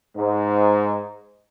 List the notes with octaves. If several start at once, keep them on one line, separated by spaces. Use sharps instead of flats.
G#2